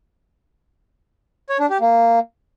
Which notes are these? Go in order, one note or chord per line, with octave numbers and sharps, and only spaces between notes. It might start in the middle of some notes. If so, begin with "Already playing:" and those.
C#5
D4
G4
A#3